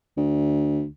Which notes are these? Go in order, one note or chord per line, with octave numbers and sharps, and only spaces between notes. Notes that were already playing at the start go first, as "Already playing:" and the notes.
D2